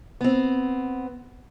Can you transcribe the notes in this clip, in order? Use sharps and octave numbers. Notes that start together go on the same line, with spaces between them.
B3 C4